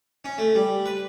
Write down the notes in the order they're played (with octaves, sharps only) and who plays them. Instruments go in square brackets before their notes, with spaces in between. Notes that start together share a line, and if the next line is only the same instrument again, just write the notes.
[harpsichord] C#4
A3
G3
B4